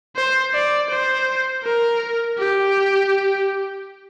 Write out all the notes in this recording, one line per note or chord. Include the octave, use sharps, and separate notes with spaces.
C5
D5
C5
A#4
G4